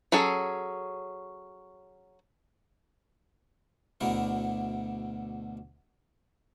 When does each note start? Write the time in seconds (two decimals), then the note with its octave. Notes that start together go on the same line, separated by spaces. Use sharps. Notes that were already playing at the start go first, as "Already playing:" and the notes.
0.12 F#3 C#4 G#4 A4
4.01 D2 B2 D3 A3 E4 A#4